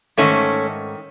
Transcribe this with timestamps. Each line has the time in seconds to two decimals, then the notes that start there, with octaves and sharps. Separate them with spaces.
0.17 G#2 D#3 A3 C#4